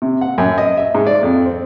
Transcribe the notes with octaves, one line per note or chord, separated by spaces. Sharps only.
C3
F#5
F#2
D#5
E5
G#2
D5
F2
C4